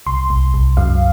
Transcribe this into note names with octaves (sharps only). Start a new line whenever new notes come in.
C2 C6
C2
C2
F#2 F5